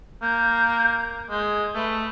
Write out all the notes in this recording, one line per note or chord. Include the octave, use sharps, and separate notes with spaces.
A#3 G6
G#3 G#6
A3 B4